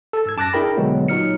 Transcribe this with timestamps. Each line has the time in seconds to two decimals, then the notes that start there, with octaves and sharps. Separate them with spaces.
0.13 A4 A6
0.26 G#2 E6 G#6
0.37 F#2 A5 D6 F#6 A6 A#6
0.53 D4 E4 G#4 A#4 G5 B5
0.77 B1 D3 F#3 G#3 B3
1.08 A#2 F#3 D#4 F6 C#7